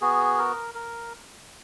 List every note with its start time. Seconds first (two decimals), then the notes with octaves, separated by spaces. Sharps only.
0.01 B3 F#4 G#4
0.38 A#4
0.74 A#4